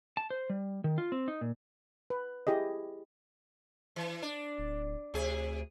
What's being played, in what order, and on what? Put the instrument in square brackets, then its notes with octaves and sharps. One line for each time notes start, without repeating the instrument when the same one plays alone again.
[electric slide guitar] A5
C5
G3
D#3
F4
C4
D#4
A#2
[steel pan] B4
E4 G4 G#4 D#5
[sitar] E3
D4
[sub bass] D1
[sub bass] D2 [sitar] C3 G#4